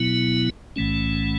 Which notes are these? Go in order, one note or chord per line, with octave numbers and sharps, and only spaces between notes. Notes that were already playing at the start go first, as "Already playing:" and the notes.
Already playing: B2 F#3 B3 E4
B1 A2 E3 A3 C#4